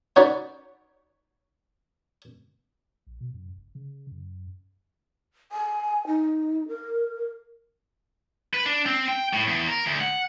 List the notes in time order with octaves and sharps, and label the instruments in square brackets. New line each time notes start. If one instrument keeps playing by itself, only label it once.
[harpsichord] C#4 D#4 F#4 B4 C#5 D5
[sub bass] A#1
B2
F#2
F1
C#3
F#2
[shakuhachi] G#5
D#4
A#4
[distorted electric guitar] B4
D4
C4
G5
A2
E2
A#4
D2
F#5